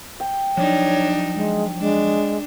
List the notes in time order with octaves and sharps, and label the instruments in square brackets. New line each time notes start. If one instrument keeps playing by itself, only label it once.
[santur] G5
[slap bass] F3 F#3 [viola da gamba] D4 D#4 [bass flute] C#5
[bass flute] G#3
[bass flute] G#3 [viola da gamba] D4